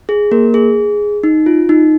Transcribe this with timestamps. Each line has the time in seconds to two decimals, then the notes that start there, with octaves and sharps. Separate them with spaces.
0.09 G#4
0.31 A#3 A#4
0.54 G#4
1.23 D#4
1.46 F4
1.69 D#4